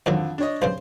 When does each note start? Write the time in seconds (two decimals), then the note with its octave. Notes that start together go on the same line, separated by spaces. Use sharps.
0.06 F2 G#2 D3 D#3 F#3
0.38 D4 C#5 D#5
0.62 B1 G2 C#3 C5